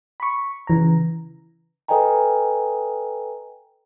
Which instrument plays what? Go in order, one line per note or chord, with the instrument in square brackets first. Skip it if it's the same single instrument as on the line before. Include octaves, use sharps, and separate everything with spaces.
[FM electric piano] B5 C#6
C#3 E3 A#5
[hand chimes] A4 B4 D#5 G5 G#5 A#5